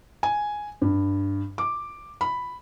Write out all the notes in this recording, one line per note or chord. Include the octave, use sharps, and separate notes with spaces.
G#5
G2
D6
B5